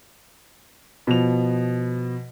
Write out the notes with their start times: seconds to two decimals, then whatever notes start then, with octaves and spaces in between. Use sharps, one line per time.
1.07 B2 F3 F7